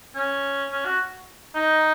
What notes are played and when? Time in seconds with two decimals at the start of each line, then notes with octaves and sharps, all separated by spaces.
0.15 C#4
0.71 C#4
0.85 F#4
1.55 D#4